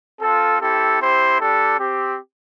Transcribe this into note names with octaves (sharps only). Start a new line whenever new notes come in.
C4 F4 A4
C4 E4 G4 A4
C4 E4 G4 C5
G3 D4 G4 A4
C4 G4